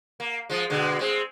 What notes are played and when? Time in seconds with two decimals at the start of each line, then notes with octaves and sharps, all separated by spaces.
0.20 A#3
0.50 F3 G#3
0.70 B2 D3 G#3
0.99 G#3 C4